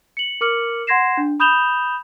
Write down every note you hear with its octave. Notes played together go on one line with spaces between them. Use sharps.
C#7 F#7
A#4 D6 F6 C#7 F#7
F#5 C6 G#6 A#6 C7 E7
D4
B5 D#6 G6 E7 F7 G7